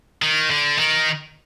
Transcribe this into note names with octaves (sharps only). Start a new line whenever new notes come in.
D#3
D3
D#3